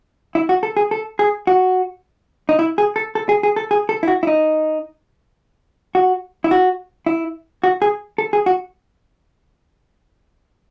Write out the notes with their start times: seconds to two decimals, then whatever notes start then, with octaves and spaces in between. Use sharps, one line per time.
0.35 E4
0.49 F#4
0.63 A4
0.77 G#4
0.91 A4
1.19 G#4
1.47 F#4
2.49 D#4
2.59 E4
2.78 G#4
2.96 A4
3.15 A4
3.29 G#4
3.43 G#4
3.56 A4
3.71 G#4
3.89 A4
4.03 E4
4.08 F#4
4.23 E4
4.27 D#4
5.95 F#4
6.44 E4
6.51 F#4
7.06 E4
7.64 F#4
7.82 G#4
8.18 A4
8.33 G#4
8.46 F#4